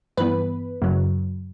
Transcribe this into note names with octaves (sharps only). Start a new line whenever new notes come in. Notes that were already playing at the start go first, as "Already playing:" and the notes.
G2 E3 B3 B4
F#2 C#3 F#3